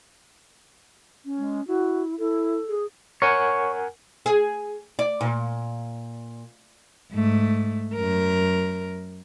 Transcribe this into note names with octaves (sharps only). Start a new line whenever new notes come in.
C#4
G#3
E4 F#4
E4 A4
G#4
A#4 C#5 F#5 G#5
G#4
D5
A#2
G#2 A3
F#2 A#4